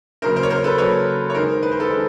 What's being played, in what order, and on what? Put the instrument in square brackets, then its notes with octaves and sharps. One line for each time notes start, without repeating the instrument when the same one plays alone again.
[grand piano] C#3 F#3 A#3 A#4 C5
A#4 C5
C#5
A#4 C5
A4 B4
C#3 F#3 A#3 B4 C#5
C#5
D#3 G#3 A#4 C5
B4
C5
A4 B4
D#3 G#3